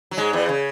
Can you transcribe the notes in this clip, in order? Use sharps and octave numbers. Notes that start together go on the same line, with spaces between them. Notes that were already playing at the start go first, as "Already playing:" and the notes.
F#3
G#2 G#3
E2 E3
C#3